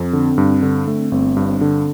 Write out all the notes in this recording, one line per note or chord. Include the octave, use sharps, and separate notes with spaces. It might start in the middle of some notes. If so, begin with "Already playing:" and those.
Already playing: F2 C4
D3
G2
D3
A3
G1 C4
G2
C4
D3